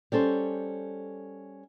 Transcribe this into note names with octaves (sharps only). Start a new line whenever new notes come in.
G3 C#4 A4 C5